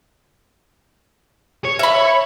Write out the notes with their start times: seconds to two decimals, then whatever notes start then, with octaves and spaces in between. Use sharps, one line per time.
1.65 C#5
1.79 E5 B5